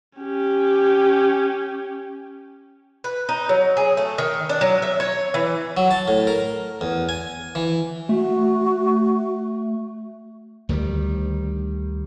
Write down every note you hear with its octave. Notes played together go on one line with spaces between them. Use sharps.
C#4 G4
B4
D#4
F#3
G#4
A3
D#3
D4
F#3
E5
C#5
E3
F#3
A5
A2
A#4
E2
G#5
E3
A3 F#4
D2 D#3 F#3 G3